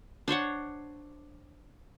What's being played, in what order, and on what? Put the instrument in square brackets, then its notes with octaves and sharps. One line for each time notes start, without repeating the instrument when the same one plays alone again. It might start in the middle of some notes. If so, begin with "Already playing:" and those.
[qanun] D4 C5 C#5 F#5